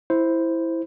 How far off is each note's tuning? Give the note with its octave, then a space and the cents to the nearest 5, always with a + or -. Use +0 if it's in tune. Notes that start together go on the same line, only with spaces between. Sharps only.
E4 +0 C5 +0